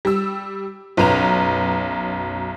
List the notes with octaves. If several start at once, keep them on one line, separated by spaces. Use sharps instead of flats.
G3 E6
B1 F#2 B4 A#5 F7